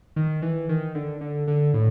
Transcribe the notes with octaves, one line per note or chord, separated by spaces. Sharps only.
D#3
E3
D#3
D3
D3
D3
A2